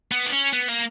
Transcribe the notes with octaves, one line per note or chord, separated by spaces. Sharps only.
B3
D4
C#4
B3
A#3